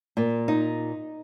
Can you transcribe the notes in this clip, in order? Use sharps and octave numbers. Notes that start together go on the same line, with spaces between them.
A#2
D#4